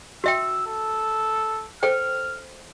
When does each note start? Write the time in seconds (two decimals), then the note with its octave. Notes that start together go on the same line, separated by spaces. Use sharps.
0.24 F#4 E5 G5 E6
0.67 A4
1.83 A4 C5 G5 F6